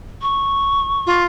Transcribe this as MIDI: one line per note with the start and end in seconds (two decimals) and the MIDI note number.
0.22 1.23 85
1.07 1.25 65